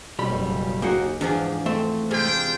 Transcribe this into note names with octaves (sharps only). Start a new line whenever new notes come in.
F#1 B1 B2 G3 C#4 B5
D#2 A#3 F#4 G#4 F#5 G5
E2 G#2 F3 D4 G#4
A3 C4 E5
C3 G#3 C4 D4 F4 G5